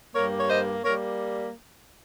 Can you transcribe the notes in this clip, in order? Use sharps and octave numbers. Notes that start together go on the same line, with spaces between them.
G2 G3 A#3 A#4 C#5
C#5
C5 D#5
G3 A#3 A#4 C#5